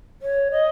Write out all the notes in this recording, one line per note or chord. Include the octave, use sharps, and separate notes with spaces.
C#5
D#5